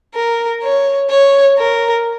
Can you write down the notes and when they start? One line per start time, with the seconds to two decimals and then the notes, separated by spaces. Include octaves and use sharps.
0.15 A#4
0.63 C#5
1.10 C#5
1.58 A#4